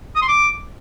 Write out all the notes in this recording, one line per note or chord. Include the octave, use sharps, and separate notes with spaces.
D#6
C6
D6